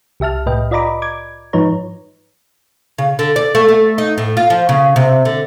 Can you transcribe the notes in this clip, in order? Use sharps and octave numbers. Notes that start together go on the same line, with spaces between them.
C2 G4 E5 A5 F6
C2 A2 B4 D#5 G5
F4 D5 D#5 A#5 B5 D6
D6 G#6
G#2 F3 D#4 B4 C#5 A#5
C#3
D3
D5
A3
A3
D#4
A2
F4
F3
C#3
C3
D3